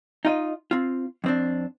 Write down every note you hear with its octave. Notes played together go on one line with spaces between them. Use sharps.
D#4 F4 D#5
C4 F4
F2 C4 D4